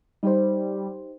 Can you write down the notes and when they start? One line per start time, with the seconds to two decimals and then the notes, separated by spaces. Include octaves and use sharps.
0.23 G3 D#4 G4 C5